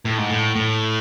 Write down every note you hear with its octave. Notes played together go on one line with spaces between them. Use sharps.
A2
G#2
A2
A2